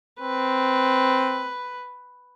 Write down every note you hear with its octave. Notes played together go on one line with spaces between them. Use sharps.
C4 B4